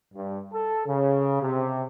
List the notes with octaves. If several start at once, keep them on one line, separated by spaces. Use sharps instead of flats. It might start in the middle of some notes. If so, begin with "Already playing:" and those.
G2
A4
C#3
C3